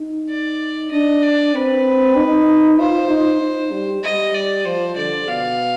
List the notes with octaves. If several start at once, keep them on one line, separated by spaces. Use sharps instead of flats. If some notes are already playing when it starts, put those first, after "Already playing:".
Already playing: D#4
D5
D4 D#5
D5
C4 B4
D#4
F4 C5
D#4
D#4
G3
G3 D#5
D5
F3 C5
D3 D5
B2 F5